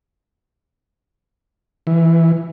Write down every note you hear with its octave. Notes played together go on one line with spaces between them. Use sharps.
E3